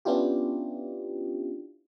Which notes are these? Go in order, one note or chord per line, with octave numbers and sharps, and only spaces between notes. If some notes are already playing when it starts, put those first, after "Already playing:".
B3 C#4 D4 E4 F4 G4